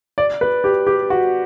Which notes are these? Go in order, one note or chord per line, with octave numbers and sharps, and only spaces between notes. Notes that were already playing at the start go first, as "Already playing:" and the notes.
D5
B4
G4
G4
F#4